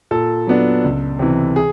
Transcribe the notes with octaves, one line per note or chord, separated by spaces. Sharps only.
A#2 A4
F#3 B3 D4
C#2
C3 E3
G#4